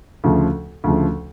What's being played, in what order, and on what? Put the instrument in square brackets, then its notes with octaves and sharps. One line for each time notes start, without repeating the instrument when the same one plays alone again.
[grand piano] D2 C#3 F3 A3
D2 C#3 F3 A3